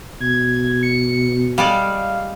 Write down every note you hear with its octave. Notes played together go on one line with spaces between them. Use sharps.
B2 G#6
C#7
G3 G#3 D5 F5